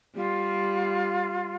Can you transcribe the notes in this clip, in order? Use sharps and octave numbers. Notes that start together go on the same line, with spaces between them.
G3 F4